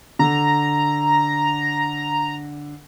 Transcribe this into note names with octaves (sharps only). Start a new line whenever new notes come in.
D3 A#5